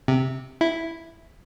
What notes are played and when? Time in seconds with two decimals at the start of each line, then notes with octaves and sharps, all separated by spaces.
0.08 C3
0.61 E4